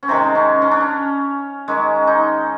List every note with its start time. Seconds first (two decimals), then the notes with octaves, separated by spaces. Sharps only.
0.03 C#4
0.08 C3 D#3 G#3 C4
0.35 C#4
0.62 C#4
0.72 D4
0.81 C#4
1.68 D#3 G#3 C#4
2.07 D#4